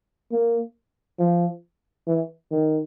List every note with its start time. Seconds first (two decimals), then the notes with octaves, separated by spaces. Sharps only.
0.32 A#3
1.19 F3
2.07 E3
2.51 D#3